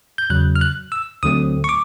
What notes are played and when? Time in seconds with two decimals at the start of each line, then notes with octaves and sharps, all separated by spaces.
0.18 G6
0.30 E2 C#3 F#3 F#6
0.56 F6
0.61 F#6
0.92 E6
1.23 D2 D3 F#3 A3 C4 D#6
1.64 C#6
1.69 D6